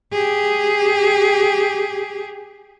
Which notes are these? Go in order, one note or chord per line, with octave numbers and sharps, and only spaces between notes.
G4 G#4